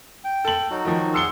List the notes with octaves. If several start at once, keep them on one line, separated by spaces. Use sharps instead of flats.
G5
A4 F#7
F#3 D#4 F#4
D#3 F3
G#4 F#5 C6 E6 C#7 G7